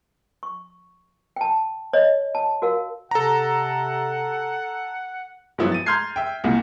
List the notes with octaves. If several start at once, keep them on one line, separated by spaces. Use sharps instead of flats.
C#6
G5 A5
C#5 D#5
A5
F#4 A#4 F5
C3 A4 F#5 A#5
G2 F3 F#3 B3 E4
A6 D#7
A#5 C6 F6 G6 G#6 C7
E5 G5
C2 A#2